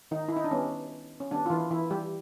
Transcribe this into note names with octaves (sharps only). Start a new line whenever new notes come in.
D#3 D#4
E4
D#4
D4
D#3 G3 B3 C#4
C#4
D#3 G3 B3 D4
F4
E3 E4
E3 E4
G3 G4